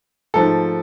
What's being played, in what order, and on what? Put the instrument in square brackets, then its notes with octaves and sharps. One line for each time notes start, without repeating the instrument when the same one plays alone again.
[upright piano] G#2 F3 A3 A4